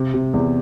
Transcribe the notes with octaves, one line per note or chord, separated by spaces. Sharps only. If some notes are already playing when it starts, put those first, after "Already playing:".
Already playing: C3
C3
E2